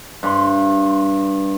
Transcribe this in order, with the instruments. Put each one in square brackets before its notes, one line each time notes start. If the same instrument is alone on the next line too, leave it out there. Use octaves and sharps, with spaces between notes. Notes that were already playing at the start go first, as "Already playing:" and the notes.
[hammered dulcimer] G2 C6